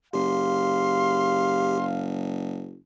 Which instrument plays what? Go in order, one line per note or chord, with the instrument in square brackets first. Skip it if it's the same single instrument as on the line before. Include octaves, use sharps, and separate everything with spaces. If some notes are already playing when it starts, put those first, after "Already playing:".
[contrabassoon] F#1 [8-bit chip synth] G4 [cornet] F5 [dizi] C6